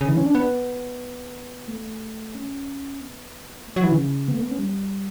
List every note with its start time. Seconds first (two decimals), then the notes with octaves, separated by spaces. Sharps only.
0.01 C#3
0.09 E3
0.17 C#4
0.26 D4
0.35 B3
1.68 A3
2.35 C#4
3.01 B3
3.67 A3
3.76 F#3
3.84 E3
3.92 C#3
4.28 B3
4.34 A3
4.42 B3
4.51 C#4
4.59 G3